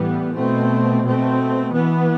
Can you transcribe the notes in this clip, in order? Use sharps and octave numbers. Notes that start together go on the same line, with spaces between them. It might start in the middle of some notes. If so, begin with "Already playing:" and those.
Already playing: A2 E3 G3 B3
B2 A3 C4
B2 A3 C4
E3 B3